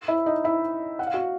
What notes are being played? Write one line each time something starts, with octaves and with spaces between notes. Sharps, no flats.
E4 E5
D#4 D#5
E4 E5
F#5
F5
F#4 F#5